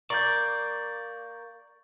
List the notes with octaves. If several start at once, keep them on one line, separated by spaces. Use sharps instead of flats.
A#3 D5 C#6 G6